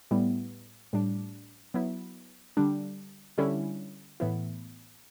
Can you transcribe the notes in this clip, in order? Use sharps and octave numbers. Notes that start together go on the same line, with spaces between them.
A2 G3 B3 E4
A2 G3 D4
F#3 B3 E4
D3 G3 D4
D3 G3 C#4 E4
A2 E3 B3 E4